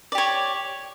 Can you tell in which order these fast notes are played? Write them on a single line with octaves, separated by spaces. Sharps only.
D5 G4 C#5